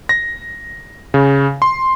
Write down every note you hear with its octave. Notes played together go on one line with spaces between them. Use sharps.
A#6
C#3
C6